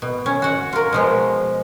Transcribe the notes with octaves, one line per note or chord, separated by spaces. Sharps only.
B2
C#4
F#4 F#5
F4 A#4
B2 F3 G#3